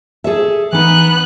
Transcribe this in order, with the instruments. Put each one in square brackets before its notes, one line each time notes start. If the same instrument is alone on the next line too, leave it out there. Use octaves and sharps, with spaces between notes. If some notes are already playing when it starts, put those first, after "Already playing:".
[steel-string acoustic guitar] G#4 A4 E5
[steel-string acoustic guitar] E3 D#4 [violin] B3 F#6